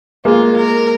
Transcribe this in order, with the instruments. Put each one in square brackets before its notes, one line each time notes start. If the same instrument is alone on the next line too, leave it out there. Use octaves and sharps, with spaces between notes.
[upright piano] G#3 A#3 [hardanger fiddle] F4
[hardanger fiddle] A#4